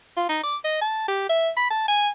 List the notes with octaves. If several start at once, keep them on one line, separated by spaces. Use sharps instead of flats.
F4
D#4
D6
D#5
A5
G4
E5
B5
A5
G#5